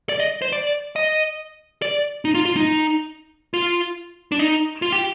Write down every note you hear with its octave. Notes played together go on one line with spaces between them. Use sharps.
D5
D#5
C5
D5
D#5
D5
D#4
F4
F4
D#4
F4
D4
D#4
F4
G4